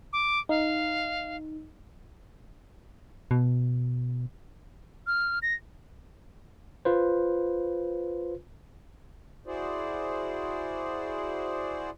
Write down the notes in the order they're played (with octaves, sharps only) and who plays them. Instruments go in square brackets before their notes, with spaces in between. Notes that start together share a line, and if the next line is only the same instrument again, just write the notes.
[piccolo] D6
[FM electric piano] D#4 [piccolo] F5
[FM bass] B2
[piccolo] F6
A#6
[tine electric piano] F4 B4 C5
[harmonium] E4 F#4 G#4 C5 D5